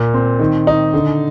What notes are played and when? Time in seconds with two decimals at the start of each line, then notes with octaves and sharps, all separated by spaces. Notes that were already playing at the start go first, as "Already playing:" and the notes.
Already playing: A#2 A#3
0.14 C4
0.39 D#3
0.67 D#4
0.94 D3